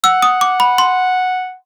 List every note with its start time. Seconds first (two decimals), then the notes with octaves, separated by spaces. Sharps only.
0.04 F#5 E6
0.22 D#6
0.41 D6
0.60 B5
0.78 C6